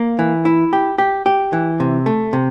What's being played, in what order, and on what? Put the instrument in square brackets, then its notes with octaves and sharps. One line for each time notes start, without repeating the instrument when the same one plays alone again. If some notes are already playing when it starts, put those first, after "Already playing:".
Already playing: [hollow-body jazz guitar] A#3
E3
E4
G4
G4
G4
E3
C3
A3
C3